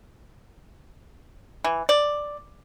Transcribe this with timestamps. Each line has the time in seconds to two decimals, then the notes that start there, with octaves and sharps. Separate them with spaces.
1.64 E3
1.89 D5